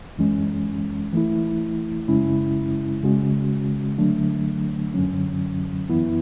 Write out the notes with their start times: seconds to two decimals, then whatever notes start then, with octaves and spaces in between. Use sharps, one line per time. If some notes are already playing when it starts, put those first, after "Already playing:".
0.18 F#2 E3 G#3 C#4
1.13 E3 A3 E4
2.08 F#2 C#3 G#3 C#4 E4
3.03 C#3 G#3 C#4 F#4
3.98 D3 F#3 A3 D4
4.94 F#2 D3 F#3 C#4
5.90 F#2 E3 B3 E4